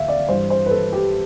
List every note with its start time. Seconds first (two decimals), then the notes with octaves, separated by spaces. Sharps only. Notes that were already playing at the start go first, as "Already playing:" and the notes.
Already playing: D2 E5 F5
0.08 D5
0.29 G2 E3 C5
0.50 C5
0.66 B4
0.71 A4
0.93 G4